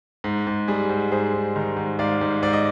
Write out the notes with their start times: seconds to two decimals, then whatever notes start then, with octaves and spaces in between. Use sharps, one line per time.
0.24 G#2
0.47 G#2
0.68 G3 G#4
0.89 G#2
1.11 G#2 G#4 C5
1.34 G#2
1.56 D#3
1.77 G#2
1.99 G#2 D5 F5
2.21 G#2
2.42 G#2 D5
2.53 D#5